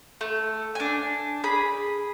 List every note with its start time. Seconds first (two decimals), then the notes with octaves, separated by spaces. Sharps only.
0.21 A3
0.75 D4 G#5
1.44 G#4 B5